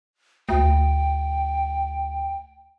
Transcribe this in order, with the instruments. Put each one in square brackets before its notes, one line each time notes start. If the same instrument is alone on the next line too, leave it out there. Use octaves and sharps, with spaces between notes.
[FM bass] D2 [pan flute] G5